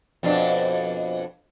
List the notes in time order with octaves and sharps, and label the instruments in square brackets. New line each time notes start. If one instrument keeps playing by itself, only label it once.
[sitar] F2 B2 D4